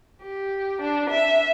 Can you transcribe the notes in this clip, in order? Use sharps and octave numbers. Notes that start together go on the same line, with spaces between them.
G4
D4
E5